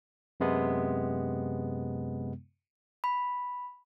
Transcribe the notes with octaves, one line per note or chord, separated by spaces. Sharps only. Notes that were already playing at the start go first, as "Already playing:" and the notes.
F#2 C3 G#3 B3
B5